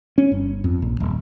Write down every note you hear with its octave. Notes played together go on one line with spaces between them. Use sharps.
C#4
G1
F2
A#1
D#1